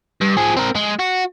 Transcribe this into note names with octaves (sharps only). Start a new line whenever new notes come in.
G2
F3 G#4
C4 A#4
G#3
F#4